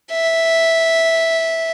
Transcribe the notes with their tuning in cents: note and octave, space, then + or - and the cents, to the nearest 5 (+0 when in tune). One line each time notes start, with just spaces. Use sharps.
E5 -5